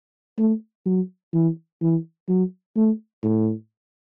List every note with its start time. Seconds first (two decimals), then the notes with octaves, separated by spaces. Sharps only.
0.38 A3
0.86 F#3
1.33 E3
1.81 E3
2.29 F#3
2.76 A3
3.23 A2